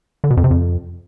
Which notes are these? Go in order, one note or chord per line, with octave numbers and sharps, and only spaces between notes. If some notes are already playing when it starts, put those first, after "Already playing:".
D3
B2
F2
C3
F2